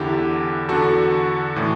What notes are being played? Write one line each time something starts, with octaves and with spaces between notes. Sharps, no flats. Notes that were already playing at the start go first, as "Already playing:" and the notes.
Already playing: E2 D3 E4 G4
E2 D3 F#4 A4
A2 E3